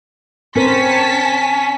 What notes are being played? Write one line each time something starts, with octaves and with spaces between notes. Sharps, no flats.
C4 C#4 A#4 C5 A5 B6